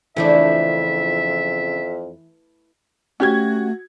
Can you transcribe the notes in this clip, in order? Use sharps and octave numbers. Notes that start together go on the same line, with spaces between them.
F2 C#3 E3 F3 A3 D4 E4 E5
A3 C#4 F#4 G4 G#6